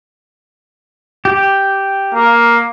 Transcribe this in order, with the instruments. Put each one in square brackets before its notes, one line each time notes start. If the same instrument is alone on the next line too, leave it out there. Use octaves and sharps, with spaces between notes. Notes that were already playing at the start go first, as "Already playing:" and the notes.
[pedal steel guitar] G4
[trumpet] A#3